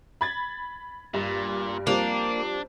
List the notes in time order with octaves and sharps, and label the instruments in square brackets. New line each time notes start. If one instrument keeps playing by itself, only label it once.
[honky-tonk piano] B5 G#6 A6
[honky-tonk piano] G2 [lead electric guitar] A#2
[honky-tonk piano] F3 G3 C4 [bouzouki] A#3 [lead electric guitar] D4